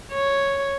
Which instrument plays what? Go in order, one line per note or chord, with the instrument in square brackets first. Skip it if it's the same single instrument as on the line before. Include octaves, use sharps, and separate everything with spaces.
[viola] C#5